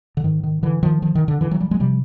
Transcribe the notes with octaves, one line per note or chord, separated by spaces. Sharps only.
D3
G#2 D#3
D#3
D3 E3
D#3 F3
D#3 F3
D#3
D3
D3 E3
E3 F#3
F3 G3
F#3 G#3
C3 F3 G3